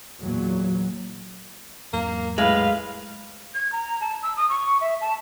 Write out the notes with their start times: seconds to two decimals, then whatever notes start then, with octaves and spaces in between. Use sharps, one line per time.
0.20 E2 A#2 F#3
1.93 E2 G#2 F#3 A#3
2.38 A2 G#3 B4 F5
3.54 G#6
3.72 A#5
4.01 A5
4.23 E6
4.37 D#6
4.49 C#6
4.81 E5
5.01 A5